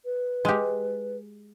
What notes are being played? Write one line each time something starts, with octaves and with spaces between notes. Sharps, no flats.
B4
G#3 G4